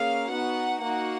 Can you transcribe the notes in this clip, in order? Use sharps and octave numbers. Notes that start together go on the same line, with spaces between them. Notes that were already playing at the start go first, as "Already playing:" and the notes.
Already playing: A#3 C#4 G#4 F5
B3 D#4 F#4 F#5
A#3 D#4 F#4 F#5